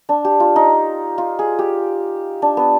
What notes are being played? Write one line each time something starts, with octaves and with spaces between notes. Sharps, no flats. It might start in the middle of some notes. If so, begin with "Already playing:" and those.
D4
G4
F4
D#4
F4
G#4
G4
D4
B3